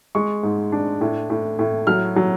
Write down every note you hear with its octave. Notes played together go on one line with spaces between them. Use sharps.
G#3 C#6
G#2
D4
A2
A2
A2
F#3 F6
F#3